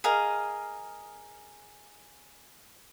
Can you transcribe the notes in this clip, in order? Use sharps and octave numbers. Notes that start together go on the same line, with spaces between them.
G#4 A#4 D#5 F5